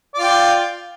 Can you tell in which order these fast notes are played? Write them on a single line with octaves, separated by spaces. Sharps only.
D5 F4 G5